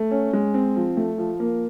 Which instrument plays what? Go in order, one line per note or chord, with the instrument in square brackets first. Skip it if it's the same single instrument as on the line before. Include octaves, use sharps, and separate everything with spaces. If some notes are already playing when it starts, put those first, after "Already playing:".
Already playing: [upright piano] A3
C#4
G#3
C4
F3
A3
F3
A#3